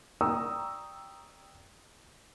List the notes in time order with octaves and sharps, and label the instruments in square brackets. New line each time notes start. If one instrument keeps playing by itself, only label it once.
[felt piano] D5 G5 A#5 C#6 D#6 E6